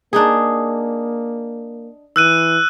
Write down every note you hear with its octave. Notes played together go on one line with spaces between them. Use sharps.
A#3 D4 D#4 G#4
E3 E6 F#6 D#7